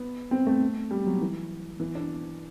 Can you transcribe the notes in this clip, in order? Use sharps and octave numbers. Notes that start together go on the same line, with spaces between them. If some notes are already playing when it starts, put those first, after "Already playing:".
Already playing: B3
C4
A3
G3
F#3
E3
E3
D4